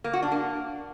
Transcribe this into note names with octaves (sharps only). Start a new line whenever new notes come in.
A#3
F#4
D4
A#3